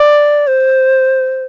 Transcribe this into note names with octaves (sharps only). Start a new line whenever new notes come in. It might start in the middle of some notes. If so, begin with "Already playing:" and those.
Already playing: D5
C5